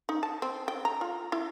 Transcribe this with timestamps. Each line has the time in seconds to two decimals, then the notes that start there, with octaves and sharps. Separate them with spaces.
0.09 D#4
0.23 A5
0.42 C4
0.68 G5
0.85 A#5
1.01 F4
1.32 E4